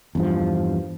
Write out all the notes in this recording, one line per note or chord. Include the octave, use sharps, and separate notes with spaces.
E2 G2 F3